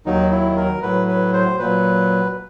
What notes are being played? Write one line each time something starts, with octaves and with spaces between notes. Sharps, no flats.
D#2 D#3 F#3 D#4
E4
A#4
A2 F#3 B4
B4
C5
A#2 F#3 B4